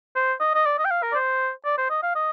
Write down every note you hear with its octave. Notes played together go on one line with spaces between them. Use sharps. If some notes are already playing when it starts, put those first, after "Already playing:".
C5
D#5
D#5
D5
D#5
G5
F5
A#4
D5
C5
D5
C5
D#5
F5
D#5